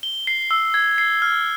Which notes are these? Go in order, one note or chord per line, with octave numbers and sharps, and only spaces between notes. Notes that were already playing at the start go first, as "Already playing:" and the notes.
G7
C7
E6
G#6
C7
F6